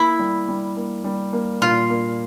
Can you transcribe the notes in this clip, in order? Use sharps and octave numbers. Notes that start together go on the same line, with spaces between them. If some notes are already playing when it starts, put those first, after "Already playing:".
Already playing: A#3 E4
G3
G3
A#3
G3
A#3
A#2 F4
A#3